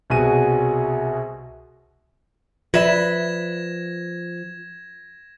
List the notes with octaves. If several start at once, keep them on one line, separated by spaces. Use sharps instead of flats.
C2 B2 F#4 G#4 D#7
F3 F4 B4 D5 E5 G#6 A#6 E7